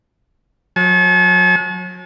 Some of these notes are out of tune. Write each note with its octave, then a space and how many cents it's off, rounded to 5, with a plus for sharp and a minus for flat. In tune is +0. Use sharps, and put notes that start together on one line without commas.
F#3 -35 A5 -45